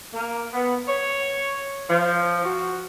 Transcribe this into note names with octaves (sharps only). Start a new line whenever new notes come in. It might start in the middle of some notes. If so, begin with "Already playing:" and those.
A#3
B3
C#5
F3
F#4